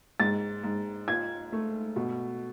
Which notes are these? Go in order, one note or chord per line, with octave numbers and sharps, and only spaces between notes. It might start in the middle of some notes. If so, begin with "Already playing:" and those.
G#2 A6
G#2
F4 G#6
A3
B2